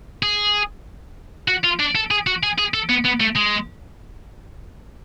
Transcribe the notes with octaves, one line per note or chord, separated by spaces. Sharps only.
G#4
F#4
F4
D4
A4
G#4
F#4
G#4
G#4
A4
B3
B3
A3
G#3